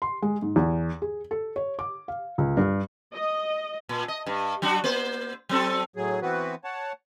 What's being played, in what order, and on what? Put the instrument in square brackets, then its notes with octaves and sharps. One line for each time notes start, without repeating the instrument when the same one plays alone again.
[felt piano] C6
G#3
G#2
E2
G#4
A4
C#5
D6
F5
C#2
G2
[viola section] D#5
[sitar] A#2
D#5
G2
F#3 D4 F#4
A#3 C5
F#3 C4 A4
[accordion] A2 F#3 G#4
E3 B3 C4 F#4 B4
C#5 F#5 A5